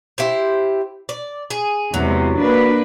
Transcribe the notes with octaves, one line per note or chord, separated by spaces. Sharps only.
E4 G4 C5
D5
G#4
E2 C3 F#3 G#3
A#3 D4 B4